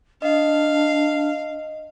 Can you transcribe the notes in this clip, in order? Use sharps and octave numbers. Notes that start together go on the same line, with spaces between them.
D4 D#5 F5